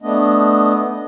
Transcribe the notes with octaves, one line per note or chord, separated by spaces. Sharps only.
A3 B3 D4 D#5